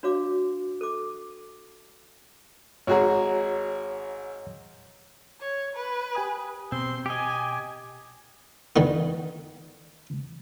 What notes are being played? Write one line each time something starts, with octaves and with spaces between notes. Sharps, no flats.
D4 F#4 C#5 F5 D6
A4 D6
G#1 F#4 G#4 C#5 F#5 A#5
C#5
B4
G4 G#5 D#6
B2 C4 C6
G4 D#5 G#5
D3 D#3 B3